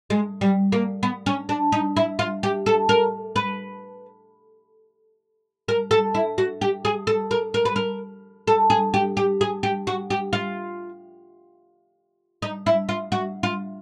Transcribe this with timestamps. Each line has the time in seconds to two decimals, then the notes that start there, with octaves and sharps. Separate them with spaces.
0.10 G#3
0.41 G3
0.72 A#3
1.03 B3
1.26 C#4
1.49 D4
1.72 D#4
1.97 E4
2.19 F4
2.43 G4
2.66 A4
2.89 A#4
3.36 B4
5.68 A#4
5.91 A4
6.15 E4
6.38 F#4
6.61 G4
6.85 G#4
7.07 A4
7.31 A#4
7.54 A#4
7.65 B4
7.76 A#4
8.48 A4
8.70 G#4
8.94 G4
9.17 G4
9.41 G#4
9.63 G4
9.87 F#4
10.10 G4
10.33 F4
12.42 D#4
12.66 E4
12.89 F4
13.12 F#4
13.43 F4